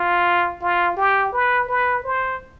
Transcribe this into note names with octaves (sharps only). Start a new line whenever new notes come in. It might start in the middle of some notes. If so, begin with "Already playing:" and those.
Already playing: F4
F4
G4
B4
B4
C5